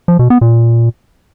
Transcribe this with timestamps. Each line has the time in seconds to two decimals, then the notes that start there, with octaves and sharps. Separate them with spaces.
0.08 F3
0.19 B2
0.30 B3
0.41 A#2